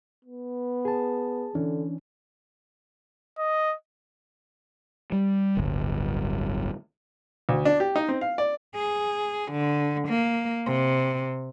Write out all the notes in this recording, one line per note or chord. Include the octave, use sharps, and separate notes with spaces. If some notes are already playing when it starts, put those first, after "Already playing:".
B3
G#4 A5
D3 E3 C#4 D4
D#5
G3
D1 G1
D2
D4
G4
D#4
C4
F5
D5
G#4
D3
A#3
C3